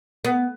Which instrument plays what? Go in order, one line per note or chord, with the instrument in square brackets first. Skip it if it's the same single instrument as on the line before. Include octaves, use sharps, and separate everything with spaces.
[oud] B3